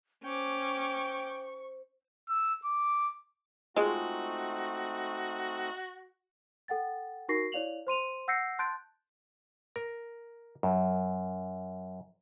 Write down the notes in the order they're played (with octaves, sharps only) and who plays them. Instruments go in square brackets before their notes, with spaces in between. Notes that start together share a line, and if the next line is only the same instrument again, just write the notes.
[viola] C#4 D6 [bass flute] C5 [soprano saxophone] G5 [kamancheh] C#6
[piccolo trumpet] E6
D6
[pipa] G#3 [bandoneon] A3 C4 D#4 [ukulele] F4 G#4 [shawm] F#4
[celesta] A4 F#5 G5 A6
D#4 F#4 A#4 C#6 A#6 C7
E4 C#5 D5 F5 F7 F#7
C5 C6 D#7 F7
F#5 E6 G6 A#6 C7 C#7
A5 C6 F#6 G6 A6 D7
[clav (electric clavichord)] A#4
F#2